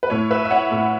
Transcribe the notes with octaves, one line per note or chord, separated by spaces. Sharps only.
B4
A2 A3 C#5
B4 E5
E5
C#5 F#5
A2 A3